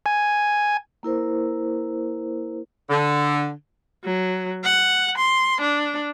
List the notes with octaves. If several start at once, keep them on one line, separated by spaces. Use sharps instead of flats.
G#5
A#3 E4 A#4 C5
D3
F#3
F#5
C6
D4